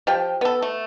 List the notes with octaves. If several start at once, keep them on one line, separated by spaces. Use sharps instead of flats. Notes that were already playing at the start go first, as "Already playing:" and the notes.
F3 G4 G5
B3 A4
A3